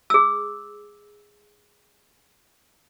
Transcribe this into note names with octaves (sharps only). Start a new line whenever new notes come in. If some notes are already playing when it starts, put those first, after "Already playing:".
G#4 E6